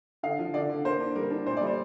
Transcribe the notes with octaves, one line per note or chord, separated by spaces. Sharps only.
D3 F5
F3
D3 D5
D3
A#3 C5
D4
G3 A#4
D4
A#2 C5
D5
G3
C5